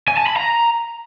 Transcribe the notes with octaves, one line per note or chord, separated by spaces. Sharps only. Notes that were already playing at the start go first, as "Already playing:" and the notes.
G#5
A5
B5
A#5